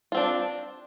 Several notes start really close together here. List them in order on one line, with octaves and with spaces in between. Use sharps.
F4 C4 D4